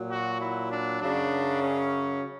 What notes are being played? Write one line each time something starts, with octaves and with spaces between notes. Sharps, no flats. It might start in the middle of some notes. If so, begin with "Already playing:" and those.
Already playing: A#2 F#3
F#4
E4
D4
F#2 C#3 F#3 D4
C#4